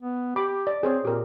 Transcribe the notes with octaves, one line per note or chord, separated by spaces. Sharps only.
B3
G4 B5 D6
D5
C4 G#4 C5 C#5
A#2 G4 A#4